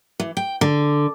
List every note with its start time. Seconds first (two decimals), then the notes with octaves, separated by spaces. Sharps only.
0.20 E3
0.37 G5
0.61 D3